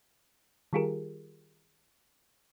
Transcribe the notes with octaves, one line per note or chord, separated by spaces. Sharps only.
D#3 G3 F4 G4 G#4 A#4